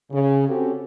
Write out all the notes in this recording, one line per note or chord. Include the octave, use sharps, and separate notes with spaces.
C#3
C4 C#4 F#4 G4 A4